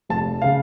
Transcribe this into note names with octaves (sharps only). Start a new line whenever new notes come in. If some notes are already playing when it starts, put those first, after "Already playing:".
F1 A5
C#3 F5